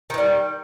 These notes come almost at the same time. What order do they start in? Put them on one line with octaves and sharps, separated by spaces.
D#3 E3 G3